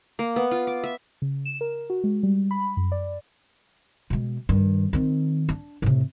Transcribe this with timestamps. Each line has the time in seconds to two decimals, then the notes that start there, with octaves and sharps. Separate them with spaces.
0.19 A#3
0.36 B3
0.51 F4
0.67 D6
0.84 E5
1.22 C#3
1.45 E7
1.61 A#4
1.90 F#4
2.04 G#3
2.23 G3
2.51 B5
2.77 F#2
2.92 D5
4.10 B2 G#3
4.49 G2 D#3
4.93 D#3 C4
5.49 D4
5.82 A2 C3